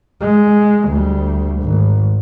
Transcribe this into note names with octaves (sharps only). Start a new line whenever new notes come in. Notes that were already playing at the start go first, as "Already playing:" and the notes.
G#3
D2 G3
G#1